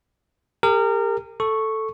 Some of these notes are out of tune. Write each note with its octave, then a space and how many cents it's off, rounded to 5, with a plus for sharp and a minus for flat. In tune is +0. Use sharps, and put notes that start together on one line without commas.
G4 +40 A#4 -25
A4 +0 C#6 -5